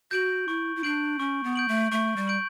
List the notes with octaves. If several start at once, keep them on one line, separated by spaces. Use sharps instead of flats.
F#4 G6 D7 F#7
E4 C#6
E4
D4 G6 D7 F#7
C#4 C#6
B3
G6 D7 F#7
A3
A3 C#6
G3
G6 D7 F#7